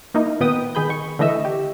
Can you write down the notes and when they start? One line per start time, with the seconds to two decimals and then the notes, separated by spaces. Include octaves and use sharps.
0.14 A#3 D#4 E4
0.40 A#2 D#3 B3 B4 G5 D#6
0.75 D#3 G#4 B5 G6
0.89 D#3 C#6
1.19 D3 E3 A3 D#5 E5 E6
1.45 G4